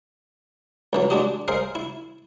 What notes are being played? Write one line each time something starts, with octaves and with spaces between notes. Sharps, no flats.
C#2 E3 F#3
G#3 D4 F#4 G4 D#5
G#4 A#4 C5 D#5 F5
E4